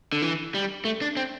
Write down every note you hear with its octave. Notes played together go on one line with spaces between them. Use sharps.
D3
E3
G3
A3
D4
C4